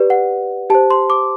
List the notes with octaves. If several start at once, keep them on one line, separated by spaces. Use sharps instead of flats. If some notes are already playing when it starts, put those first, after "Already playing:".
Already playing: G4 B4 D5
F#5
G4 C5 A5
C6
D6